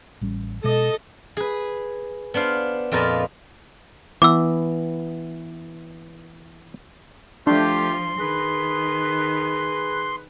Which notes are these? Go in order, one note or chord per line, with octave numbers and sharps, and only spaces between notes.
A1 G3 C#4
B2 G#3 A4 D#5
G#4 B4
B3 D4 C5 F5
F2 A#2 F4 B4 D#5 A5
E3 B3 D6 E6
F3 A3 D4 F4 G4 C6
D#3 G#4 B4